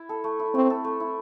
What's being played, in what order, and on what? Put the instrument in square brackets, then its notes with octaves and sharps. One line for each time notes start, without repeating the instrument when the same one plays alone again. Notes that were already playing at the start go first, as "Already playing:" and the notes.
Already playing: [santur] E4
A4
A3
E4
[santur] A3 [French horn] C4
[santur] A4
A3
E4